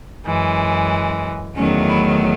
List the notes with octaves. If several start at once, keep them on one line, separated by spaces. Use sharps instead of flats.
F#2 E3 G#3
E2 D#3 F#3 A3 C#4
E4